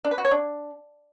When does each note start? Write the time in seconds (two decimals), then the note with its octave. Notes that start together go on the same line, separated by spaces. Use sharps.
0.04 D4
0.11 B4
0.18 F#4
0.25 C#5
0.31 D4